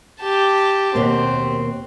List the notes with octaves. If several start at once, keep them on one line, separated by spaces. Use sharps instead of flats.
G4 A5
D#2 B2 A#3 C4